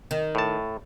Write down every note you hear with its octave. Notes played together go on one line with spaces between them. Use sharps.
D#3
A2 A5